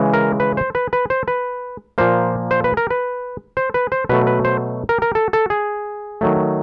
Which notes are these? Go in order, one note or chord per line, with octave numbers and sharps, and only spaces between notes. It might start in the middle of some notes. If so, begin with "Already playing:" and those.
Already playing: C#3 E3 G#3
A#4
B4
C5
B4
B4
C5
B4
A#2 F3 A#3 C5
C5
B4
A#4
B4
C5
B4
C5
B2 F#3 A3 B4
B4
C5
A#4
A#4
A4
A4
G#4
D#3 F#3 A3